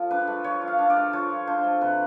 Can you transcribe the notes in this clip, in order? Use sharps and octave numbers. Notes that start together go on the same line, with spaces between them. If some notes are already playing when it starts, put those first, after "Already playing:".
Already playing: F3 A3 F4
D4 B4
A3
F3 C#5
F4
F5
D4
D5
A3
F3 C#5
F4
D4 C5
A3
C3 B4